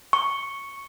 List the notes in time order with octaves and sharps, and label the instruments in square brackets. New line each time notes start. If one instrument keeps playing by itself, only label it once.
[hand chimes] C#6